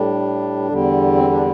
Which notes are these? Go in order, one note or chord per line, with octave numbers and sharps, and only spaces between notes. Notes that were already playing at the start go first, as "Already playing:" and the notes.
Already playing: A2 G3 D4
E2 D3 G3
C4
D4